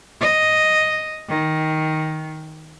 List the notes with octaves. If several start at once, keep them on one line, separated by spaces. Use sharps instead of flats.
D#5
D#3